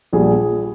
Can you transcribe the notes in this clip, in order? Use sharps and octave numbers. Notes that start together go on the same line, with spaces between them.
A#1 A#2 G3 G#4